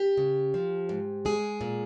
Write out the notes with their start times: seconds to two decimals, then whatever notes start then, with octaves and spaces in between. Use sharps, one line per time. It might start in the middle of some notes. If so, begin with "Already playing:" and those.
Already playing: G4
0.17 C#3
0.54 F3
0.89 G#2
1.25 G#3 G#4
1.61 A#2